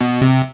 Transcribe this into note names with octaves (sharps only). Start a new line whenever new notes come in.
B2
C3